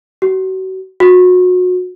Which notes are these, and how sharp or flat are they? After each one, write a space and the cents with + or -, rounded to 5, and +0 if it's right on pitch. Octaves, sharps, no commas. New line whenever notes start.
F#4 +35
F#4 -30